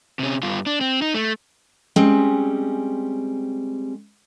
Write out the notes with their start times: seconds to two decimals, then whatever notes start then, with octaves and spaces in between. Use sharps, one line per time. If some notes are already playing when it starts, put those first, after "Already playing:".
0.19 C3 C#4
0.43 G2 F4
0.66 D4
0.81 C4
1.02 D#4
1.14 A3
1.96 G3 G#3 C4 C#4